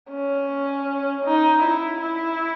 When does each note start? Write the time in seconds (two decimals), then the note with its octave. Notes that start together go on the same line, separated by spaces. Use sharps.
0.11 C#4
1.25 D#4
1.63 E4
2.01 E4